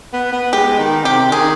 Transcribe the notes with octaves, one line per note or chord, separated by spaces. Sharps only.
B3
B3
G#3 G4
D#3
C3 G4
D#3 G#4